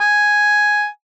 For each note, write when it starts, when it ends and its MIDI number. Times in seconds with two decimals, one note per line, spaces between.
0.01 0.87 80